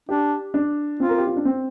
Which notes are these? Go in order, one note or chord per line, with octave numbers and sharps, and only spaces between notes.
D4 G4
D4
C4 F4
A#4
G4
F4
D4
C4